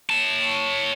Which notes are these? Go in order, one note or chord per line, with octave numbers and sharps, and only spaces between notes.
C#5 A5